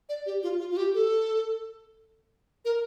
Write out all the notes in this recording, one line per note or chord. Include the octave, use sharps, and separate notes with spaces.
D5
G4
F4
F4
F4
G4
A4
A#4